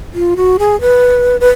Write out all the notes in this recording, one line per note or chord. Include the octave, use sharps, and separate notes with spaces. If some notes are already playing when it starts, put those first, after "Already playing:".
F4
F#4
G#4
B4
B4